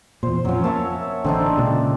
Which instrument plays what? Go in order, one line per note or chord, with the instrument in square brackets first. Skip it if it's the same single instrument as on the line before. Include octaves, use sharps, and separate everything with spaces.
[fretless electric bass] E2 A#2 [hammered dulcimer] C5
[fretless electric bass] F2 F3 [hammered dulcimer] F#3 C#4
[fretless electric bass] A#3 [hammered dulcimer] C#5 E5 A5
[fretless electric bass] A1 D3 [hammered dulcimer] C4 D4 D#4
[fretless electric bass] C#2 A#2 C#3